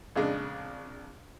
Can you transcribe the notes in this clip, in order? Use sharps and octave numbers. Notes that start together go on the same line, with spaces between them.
A#1 F2 C#3 G#3 D4 D#5